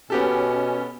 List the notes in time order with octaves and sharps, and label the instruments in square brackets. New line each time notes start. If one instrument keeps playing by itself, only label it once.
[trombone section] B2 [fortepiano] B3 G4 A4 [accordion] C#4